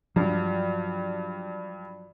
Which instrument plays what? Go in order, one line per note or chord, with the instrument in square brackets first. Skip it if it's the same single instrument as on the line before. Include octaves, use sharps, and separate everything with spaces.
[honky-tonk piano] G2 [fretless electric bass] F3 F#3